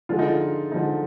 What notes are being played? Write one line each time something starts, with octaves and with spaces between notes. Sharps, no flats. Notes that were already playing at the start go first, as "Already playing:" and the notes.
D3 F3 G#3 F4
D#4
F4
D3 F3 G#3 D#4